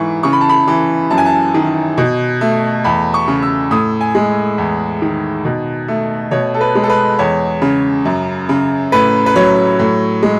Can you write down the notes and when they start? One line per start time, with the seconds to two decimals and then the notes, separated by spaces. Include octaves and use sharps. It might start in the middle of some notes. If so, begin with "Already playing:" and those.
Already playing: G#2 E3 C#6
0.23 C#3 C#6
0.33 B5
0.41 A5
0.49 B5
0.68 E3
1.10 F#2 A5
1.18 G#5
1.26 A5
1.54 D#3
1.98 B2
2.41 A3
2.84 E2 B5
3.14 C#6
3.28 C#3
3.43 E6
3.71 A2 D#6
4.01 G#5
4.15 G#3
4.58 E2
5.02 D#3
5.45 B2
5.88 A3
6.31 B2 C#5
6.54 A4
6.61 B4
6.75 G#3
6.84 A4
6.89 B4
7.19 E2 C#5
7.62 C#3
8.05 F#2
8.49 C#3
8.92 A2 B4
9.26 B4
9.36 F#3 C#5
9.79 A2
10.22 G#3